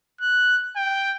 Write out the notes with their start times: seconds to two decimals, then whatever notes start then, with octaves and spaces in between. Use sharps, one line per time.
0.21 F#6
0.76 G5